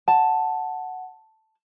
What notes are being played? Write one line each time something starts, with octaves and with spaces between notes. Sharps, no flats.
F#5 A5